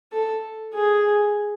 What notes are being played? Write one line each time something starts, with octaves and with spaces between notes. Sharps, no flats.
A4
G#4